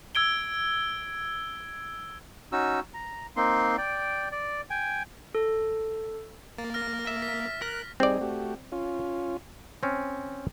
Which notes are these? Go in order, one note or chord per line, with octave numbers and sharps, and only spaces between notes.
E6 G#6 D7 G7
C#4 D#4 F#4 E6
A#5
A#3 C4 D#4 C6
D5 G5
D5
G5 G#5
A4
A#3 A6
F6 A#6
E5
B6
A#4 F#6
G3 C4 D#4 G#4 D5
A3 F#4 G4
C#4 F4
C4 C#4